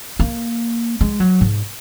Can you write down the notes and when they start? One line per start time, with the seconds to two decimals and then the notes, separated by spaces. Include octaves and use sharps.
0.20 A#3
1.01 G#3
1.20 F#3
1.41 G#2